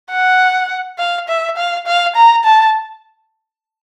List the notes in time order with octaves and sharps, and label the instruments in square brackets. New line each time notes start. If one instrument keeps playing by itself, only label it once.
[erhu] F#5
F5
E5
F5
F5
A#5
A5